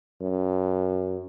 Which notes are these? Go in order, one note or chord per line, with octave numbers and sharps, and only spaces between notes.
F#2